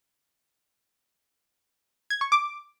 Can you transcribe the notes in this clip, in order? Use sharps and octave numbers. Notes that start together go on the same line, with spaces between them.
G#6
C#6
D6